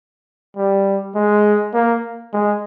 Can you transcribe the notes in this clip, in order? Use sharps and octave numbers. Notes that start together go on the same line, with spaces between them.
G3
G#3
A#3
G#3